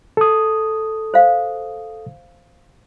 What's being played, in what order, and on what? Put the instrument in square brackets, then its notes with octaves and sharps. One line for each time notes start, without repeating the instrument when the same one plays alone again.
[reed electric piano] A4 D#6
[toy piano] C5 F5